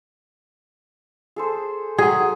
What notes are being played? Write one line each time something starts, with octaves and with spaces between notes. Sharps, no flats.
G#4 A4 C5
F#3 G#4 F#5